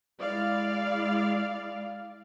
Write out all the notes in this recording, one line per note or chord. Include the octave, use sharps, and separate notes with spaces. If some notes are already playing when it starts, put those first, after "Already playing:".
G#3 E4 D5 F5